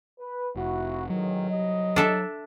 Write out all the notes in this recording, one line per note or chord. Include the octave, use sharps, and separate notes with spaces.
B4
F1 E4 F#4
A1 G#2 D#3 F#3
C2 G3 D#5
D4 A4 E5